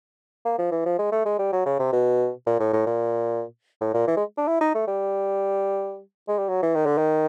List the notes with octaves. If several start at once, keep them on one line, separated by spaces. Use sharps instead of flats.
A#3
F3
E3
F3
G#3
A3
G#3
G3
F#3
C#3
C3
B2
A#2
A2
A2
A#2
A2
A#2
E3
G#3
D4
E4
D#4
A3
G3
G#3
G3
F#3
E3
D#3
D3
D#3